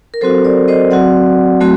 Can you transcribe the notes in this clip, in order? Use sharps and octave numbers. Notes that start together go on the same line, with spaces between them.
A#4
F#3 C4 F#4 A4 C5
A#4 D5
C5 D#5
F#3 C4 F#4 D5 F#5
F#3 A3 C4 F#4